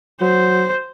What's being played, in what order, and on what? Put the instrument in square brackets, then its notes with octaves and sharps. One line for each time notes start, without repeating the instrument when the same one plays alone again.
[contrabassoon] F#3 [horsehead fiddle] C5